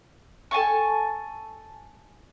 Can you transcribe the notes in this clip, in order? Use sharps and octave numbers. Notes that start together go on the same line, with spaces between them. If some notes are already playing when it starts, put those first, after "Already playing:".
A4 G#5 A5 C#6